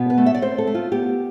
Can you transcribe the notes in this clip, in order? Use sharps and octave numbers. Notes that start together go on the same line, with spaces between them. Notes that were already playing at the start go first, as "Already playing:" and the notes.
Already playing: B2 B3
B4
A3
E5
D5
C4 C5
A4
A3
F4
B3 G4